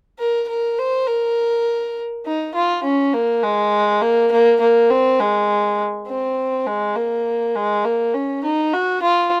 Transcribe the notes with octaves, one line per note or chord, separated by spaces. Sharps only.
A#4
A#4
C5
A#4
D#4
F4
C#4
A#3
G#3
A#3
A#3
A#3
C4
G#3
C4
G#3
A#3
G#3
A#3
C#4
D#4
F#4
F4